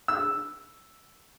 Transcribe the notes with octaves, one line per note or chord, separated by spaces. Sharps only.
E6